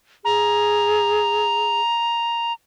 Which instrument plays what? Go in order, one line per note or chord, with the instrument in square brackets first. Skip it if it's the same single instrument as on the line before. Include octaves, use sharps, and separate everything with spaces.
[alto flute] G#4 [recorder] A#5